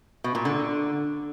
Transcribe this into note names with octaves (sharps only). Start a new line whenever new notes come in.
B2
A#2
D3